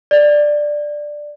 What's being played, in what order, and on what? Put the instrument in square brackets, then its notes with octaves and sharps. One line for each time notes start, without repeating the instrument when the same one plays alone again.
[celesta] D5